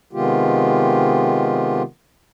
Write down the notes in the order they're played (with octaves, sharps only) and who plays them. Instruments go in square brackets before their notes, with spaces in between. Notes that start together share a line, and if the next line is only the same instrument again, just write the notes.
[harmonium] C3 D#3 G#3 B3 F4 G4